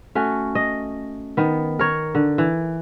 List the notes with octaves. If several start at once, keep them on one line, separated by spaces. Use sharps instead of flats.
A3 C#4 F#4
D#5
D#3 B3
A#4 C#5
D3
E3